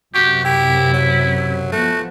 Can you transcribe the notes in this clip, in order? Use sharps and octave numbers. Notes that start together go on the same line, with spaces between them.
F#2 C3 F#4 G4
E4 G4
F#3
F3 A3 B3 F#4